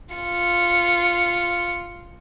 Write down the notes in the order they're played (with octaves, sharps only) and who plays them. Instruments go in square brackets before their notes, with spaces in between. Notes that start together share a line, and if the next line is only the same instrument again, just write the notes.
[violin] F4 C#7